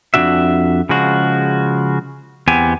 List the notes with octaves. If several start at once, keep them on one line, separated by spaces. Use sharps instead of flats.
F2 G3 D4 F#4 E5
C#3 F3 G#3 F#4
E2 B3 C4 G4 G#5